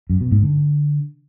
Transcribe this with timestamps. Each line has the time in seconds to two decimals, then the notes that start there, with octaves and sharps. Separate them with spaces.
0.10 F#2
0.21 B2
0.32 G#2
0.43 D3